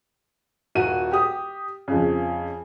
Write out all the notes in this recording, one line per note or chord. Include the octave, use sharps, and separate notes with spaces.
D#1 F#4 D#7
G4 D#6
F2 C#3